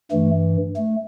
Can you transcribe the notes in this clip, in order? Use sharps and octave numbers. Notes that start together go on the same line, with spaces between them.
G2 E3 A3
A3